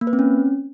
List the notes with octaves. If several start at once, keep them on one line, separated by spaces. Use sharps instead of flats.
A#3
B4
C4
C#4